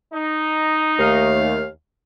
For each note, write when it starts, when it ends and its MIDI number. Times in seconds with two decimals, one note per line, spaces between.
0.12 1.40 63
0.99 1.68 39
0.99 1.68 57
0.99 1.68 77